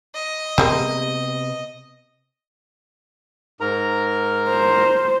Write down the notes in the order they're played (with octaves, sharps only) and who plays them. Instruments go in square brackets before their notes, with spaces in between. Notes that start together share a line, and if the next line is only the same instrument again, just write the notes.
[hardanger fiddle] D#5
[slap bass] C3 B3 [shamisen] G3 G#3 A#3
[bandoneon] G#2 A#4 A#5
[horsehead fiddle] C5